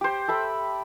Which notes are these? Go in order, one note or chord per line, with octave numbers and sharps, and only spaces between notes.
G4 C5
A4 E5 B5